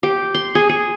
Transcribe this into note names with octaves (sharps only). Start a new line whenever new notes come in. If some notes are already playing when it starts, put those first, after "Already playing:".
G4
C6
G#4
G#4